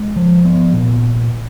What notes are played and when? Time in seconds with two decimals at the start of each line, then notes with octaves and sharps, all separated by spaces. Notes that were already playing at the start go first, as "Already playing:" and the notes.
Already playing: G#3
0.16 F3
0.45 B3
0.73 A#2